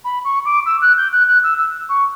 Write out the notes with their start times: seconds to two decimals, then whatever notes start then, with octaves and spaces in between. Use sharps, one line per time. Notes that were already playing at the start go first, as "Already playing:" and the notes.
0.04 B5
0.24 C#6
0.45 D6
0.66 E6
0.81 F#6
0.97 G6
1.12 F#6
1.27 F#6
1.43 E6
1.58 E6
1.89 C#6